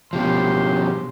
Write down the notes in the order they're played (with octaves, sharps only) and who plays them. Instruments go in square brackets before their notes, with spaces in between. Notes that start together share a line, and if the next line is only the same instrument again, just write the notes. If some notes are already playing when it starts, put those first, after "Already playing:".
[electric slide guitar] B2 F3 [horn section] C#4 G4 C6